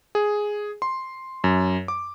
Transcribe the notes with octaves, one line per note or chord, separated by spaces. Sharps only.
G#4
C6
F#2
D6